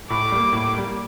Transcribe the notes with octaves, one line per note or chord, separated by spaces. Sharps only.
A2 D6
G3 A#3
A2
G3 A#3